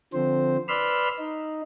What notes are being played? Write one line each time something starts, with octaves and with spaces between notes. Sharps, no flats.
D3 F3 C4 C5
B4 D5 B5 C6 E6 F6
D#4